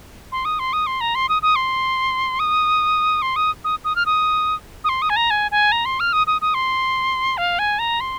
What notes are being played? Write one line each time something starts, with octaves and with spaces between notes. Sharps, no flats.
C6
D#6
C6
D#6
C6
A#5
C6
D#6
D#6
C6
D#6
C6
D#6
D#6
D#6
F6
D#6
D#6
C6
D#6
G#5
A#5
G#5
G#5
A#5
C6
F6
D#6
D#6
D#6
C6
F5
G#5
A#5
C6